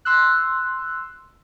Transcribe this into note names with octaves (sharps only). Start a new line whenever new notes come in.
C6 E6 F#6